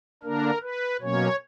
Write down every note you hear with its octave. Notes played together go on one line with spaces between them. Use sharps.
D3 A#3 D4 A#4
B4
B2 F#3 A#3 C#4 C#5